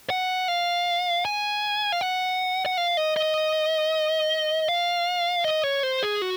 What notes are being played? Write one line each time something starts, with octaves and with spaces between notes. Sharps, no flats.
F#5
F5
G#5
F5
F#5
F#5
F5
D#5
D#5
F5
D#5
C#5
C5
G#4
F#4